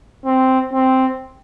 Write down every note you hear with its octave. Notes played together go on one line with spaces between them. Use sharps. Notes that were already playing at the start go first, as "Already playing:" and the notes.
C4
C4